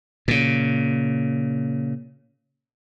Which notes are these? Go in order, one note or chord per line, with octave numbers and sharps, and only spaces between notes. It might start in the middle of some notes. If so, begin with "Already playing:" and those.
A#2 C#3